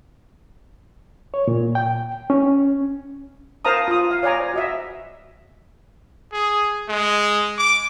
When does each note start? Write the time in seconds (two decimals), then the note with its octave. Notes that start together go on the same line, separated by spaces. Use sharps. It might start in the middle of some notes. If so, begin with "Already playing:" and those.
1.34 C#5
1.48 A#2
1.75 G5
2.30 C#4
3.65 A#4 C5 F5 A5 A#5 D#6
3.88 F4 D#6
4.11 F5
4.23 C#5 D5 G#5 A#5
4.40 C5
4.54 F#4 D#5 E5
6.33 G#4
6.89 G#3
7.58 D6